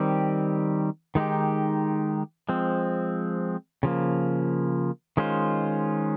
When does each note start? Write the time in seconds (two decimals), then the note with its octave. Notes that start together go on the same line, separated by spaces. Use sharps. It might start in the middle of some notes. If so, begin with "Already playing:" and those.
Already playing: D#3 G3 C4 G4
1.15 D#3 G#3 D#4 G4
2.49 F3 G#3 C4
3.83 C#3 F3 A#3
5.17 D#3 G#3 C#4 F4 C5